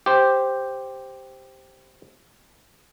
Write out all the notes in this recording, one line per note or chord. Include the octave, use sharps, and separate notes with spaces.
G4 C5